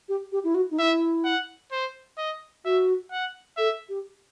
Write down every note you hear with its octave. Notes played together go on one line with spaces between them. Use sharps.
G4
G4
E4
F#4
D#4
E4 E5
F#5
C5
D#5
F#4 E5
F#5
A4 E5
G4